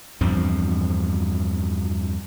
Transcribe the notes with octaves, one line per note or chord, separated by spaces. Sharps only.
E2 G2 F3 C4